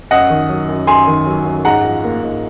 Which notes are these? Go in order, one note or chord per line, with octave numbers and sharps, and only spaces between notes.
F#2 D#5 F#5
D#3
F#3
F#2
F#2 G#5 C6
D#3
F#3
F#2
G#2 F#5 A#5
F3
A#3
G#2